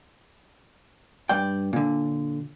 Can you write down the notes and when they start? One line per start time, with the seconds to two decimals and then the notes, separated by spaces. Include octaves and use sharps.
1.29 G2 D5 G5
1.73 A#2 D3